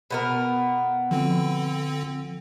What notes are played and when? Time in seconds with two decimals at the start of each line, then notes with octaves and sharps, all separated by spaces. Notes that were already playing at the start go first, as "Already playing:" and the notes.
0.11 B2 B3 A#4
1.11 D3 F3 C4